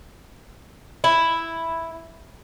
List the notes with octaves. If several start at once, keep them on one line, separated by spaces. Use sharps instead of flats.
E4